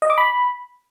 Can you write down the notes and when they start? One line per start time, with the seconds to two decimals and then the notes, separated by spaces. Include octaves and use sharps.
0.02 D#5
0.10 D6
0.18 B5